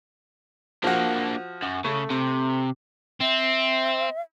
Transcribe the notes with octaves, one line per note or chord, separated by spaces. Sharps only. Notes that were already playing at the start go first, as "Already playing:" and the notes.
F3 A#3 D4 F#4
F#2
C#3 A3
C3
C4 E5